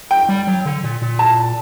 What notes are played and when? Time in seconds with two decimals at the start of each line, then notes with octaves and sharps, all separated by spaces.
0.11 G5
0.29 G3
0.47 F#3
0.66 D3
0.84 A#2
1.02 A#2
1.19 A5